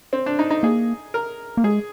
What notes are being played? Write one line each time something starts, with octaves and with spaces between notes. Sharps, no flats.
C4
D4
D#4
D#4
A#3 G#4
A#4
A#3
G#3 G#4